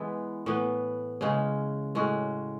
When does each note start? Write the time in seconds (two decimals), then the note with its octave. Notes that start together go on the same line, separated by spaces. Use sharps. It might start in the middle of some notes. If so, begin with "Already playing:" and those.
Already playing: E3 G#3 B3 E4
0.46 A2 E3 B3
1.21 C#3 G#3 C#4
1.95 A2 G#3 C#4 F#4